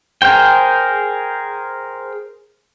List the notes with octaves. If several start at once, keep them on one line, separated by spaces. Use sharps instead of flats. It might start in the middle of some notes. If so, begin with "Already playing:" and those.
G#4 A#4 C5 G5